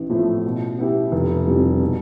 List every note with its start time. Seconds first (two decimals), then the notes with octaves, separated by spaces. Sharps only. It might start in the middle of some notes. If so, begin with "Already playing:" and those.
Already playing: A1
0.09 A2 F3 A3
0.45 B2
0.79 B3 E4 G4
1.12 F1
1.47 F2 E3 G3
1.81 B2